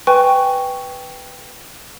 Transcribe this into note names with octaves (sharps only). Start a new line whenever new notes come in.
B4 G5 G#5 C#6